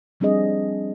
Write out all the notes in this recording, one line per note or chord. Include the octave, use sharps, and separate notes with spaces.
F3 G3 C4 D4 G#4 D#5